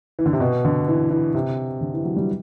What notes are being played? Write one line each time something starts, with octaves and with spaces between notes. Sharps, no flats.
E3
D3
C3
B2
D3
E3
E3
C3
D3
E3
F#3
G3